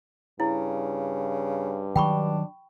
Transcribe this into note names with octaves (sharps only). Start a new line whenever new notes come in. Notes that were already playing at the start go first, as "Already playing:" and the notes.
G2 C#3 E4
D#3 F#3 D4 G5 B5 C#6